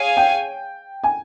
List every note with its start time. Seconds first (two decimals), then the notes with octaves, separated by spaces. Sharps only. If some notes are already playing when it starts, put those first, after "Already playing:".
Already playing: G#4 C#5 F5 G#5
0.17 G5
1.04 G#5